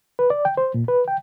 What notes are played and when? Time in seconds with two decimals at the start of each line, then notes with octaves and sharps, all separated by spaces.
0.19 B4
0.30 D5
0.45 G5
0.57 C5
0.74 A#2
0.88 B4
1.08 G5